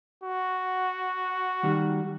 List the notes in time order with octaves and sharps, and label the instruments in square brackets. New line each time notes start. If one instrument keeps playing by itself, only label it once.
[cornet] F#4
[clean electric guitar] D#3 G3